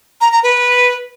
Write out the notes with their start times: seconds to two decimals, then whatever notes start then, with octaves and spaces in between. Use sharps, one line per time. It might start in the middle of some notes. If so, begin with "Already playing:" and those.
0.21 A#5
0.32 A#5
0.43 B4